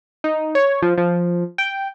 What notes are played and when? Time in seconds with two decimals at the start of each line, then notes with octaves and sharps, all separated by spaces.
0.24 D#4
0.55 C#5
0.82 F3
0.98 F3
1.58 G5